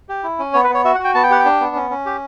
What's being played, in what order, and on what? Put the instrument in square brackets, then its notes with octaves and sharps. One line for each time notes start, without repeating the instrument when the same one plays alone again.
[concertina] G4
E4
C#4
B3 C#5
B4
B3 C#5
F#4 E5
F#5
F#4 G5
B3 A5
G5
G4 F#5
G5
D4
B3
C#4
C#4
G4